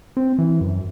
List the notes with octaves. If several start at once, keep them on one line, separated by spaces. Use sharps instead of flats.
C4
E3
F#2